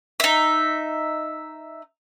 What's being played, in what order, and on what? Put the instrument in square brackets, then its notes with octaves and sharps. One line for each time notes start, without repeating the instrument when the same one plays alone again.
[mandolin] D#4 E5